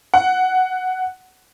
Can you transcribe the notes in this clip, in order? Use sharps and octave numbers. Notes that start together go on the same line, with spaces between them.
F#5